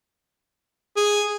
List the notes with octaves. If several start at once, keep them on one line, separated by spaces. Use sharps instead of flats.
G#4